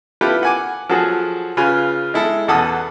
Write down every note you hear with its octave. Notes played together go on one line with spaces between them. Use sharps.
E4 F4 G4 A4 B4
F#5 G#5 D6
F3 F#3 F#4 G#4 A4
C#3 F4 B4 G#5
G#3 E4 A4
E2 B2 A4 F#5 A5 D#6